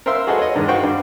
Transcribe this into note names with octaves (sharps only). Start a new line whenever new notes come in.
A#4 C5 E5 F5 C6 E6
F#4 G#4 A4 B4 D#5
C#5 D#5
G2 D#3 G#3
F#4 C5 F5 G5 C#6
G2